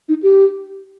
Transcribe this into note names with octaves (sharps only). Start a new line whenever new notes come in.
D#4
G4